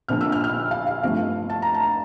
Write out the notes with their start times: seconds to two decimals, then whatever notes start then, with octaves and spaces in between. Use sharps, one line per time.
0.08 A#1 A#2 F3 A#3 D4 F6
0.21 E6
0.32 F6
0.44 F6
0.71 F5
0.87 F5
1.03 G2 F3 A3 F5
1.50 A5
1.62 A#5
1.74 A5